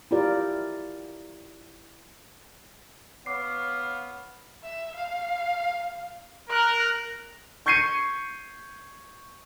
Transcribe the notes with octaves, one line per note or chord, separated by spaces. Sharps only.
E4 F4 G4 A#4 D5
B3 C#5 F5 D6 C7
E5
F5
A#4 F#6
C#6 G6 G#6 C7 C#7 D#7